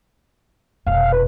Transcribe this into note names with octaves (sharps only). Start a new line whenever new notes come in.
F1 B2 F5
B4